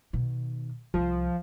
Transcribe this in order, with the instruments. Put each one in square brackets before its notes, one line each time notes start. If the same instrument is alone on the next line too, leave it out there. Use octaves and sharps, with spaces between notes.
[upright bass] B2 D#3
[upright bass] C2 [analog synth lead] F3